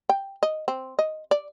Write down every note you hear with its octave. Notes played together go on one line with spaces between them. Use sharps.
G5
D#5
C4
D#5
D5